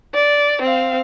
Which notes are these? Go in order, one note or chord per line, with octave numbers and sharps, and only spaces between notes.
D5
C4 F5